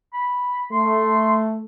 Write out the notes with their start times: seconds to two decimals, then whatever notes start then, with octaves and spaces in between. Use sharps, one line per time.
0.14 B5
0.72 A3 C6